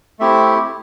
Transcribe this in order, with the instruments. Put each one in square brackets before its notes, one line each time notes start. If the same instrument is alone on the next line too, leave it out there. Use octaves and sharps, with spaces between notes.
[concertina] A3 C4 E4 G4 E5